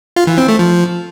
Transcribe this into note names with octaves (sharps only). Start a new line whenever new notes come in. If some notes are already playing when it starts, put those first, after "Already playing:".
F4
E3
C4
A3
F3